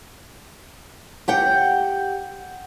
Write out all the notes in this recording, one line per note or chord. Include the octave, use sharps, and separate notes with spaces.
G4 F#5 G5